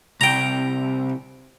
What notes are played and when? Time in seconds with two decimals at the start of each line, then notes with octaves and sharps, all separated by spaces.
0.21 C2 G5 A#5